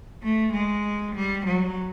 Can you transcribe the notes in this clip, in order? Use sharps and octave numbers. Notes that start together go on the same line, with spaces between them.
A3
G#3
G3
F#3